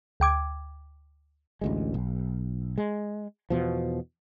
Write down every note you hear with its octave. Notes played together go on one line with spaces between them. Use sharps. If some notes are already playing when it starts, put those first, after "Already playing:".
D2 G5 D6 G#6
A1 D2 G#3
B1
G#3
E2 B2 F3